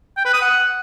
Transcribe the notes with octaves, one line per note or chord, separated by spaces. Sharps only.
G5
B4
D#6
F#5